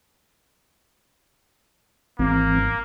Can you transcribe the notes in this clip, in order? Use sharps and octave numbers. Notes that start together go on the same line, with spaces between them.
G#1 E3 A#3 C4